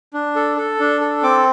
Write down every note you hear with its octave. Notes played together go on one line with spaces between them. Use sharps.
D4
A4
A4
D4
A4
C4 D6